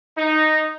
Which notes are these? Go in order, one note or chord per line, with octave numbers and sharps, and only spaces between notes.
D#4